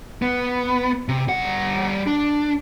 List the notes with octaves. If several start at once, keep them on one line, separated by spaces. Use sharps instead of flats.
B3
C3
G3 F#5
D4